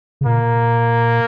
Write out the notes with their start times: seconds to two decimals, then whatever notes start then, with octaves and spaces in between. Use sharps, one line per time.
0.21 C#3
0.26 A#2 A#3